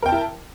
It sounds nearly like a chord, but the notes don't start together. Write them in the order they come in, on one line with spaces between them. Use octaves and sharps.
A#4 G5 A5 E4